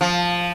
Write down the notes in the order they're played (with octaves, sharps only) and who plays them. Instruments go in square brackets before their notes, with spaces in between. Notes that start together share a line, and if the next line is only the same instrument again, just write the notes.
[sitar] F3